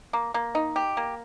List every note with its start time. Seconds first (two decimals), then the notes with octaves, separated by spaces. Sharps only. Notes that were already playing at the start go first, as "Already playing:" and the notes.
0.13 A#3
0.34 A#3
0.55 D#4
0.76 G4
0.97 A#3